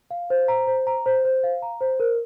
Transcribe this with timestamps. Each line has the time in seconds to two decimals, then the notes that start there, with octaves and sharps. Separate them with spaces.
0.11 F5
0.30 C5
0.48 A#5
0.67 C5
0.87 A#5
1.06 C5
1.25 C5
1.43 F5
1.62 A#5
1.81 C5
2.00 A#4